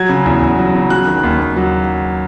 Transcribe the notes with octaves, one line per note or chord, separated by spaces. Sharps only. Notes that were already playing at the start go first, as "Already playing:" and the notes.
Already playing: F#3 G#6
C#3
E2
E2
F#3
C#3
F#3 F#6
D#3
D#2
D#2
F#3